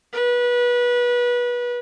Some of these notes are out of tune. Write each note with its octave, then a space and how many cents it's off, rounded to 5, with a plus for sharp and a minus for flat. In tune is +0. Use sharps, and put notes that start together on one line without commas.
B4 -25